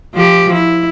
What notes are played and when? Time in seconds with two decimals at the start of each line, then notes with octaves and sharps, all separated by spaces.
0.14 F3 G4
0.53 E4